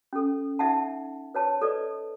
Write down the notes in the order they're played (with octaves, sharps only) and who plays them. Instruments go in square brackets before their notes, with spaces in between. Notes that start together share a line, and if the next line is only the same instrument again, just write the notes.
[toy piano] C#4 A4
D#4 E5 F#5 A5
B4 C#5 A5
A4 B4 D5 D#5